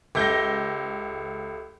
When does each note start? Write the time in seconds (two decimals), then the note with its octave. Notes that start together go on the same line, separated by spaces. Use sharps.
0.15 C#2 G4 A4 E5 G6 A#6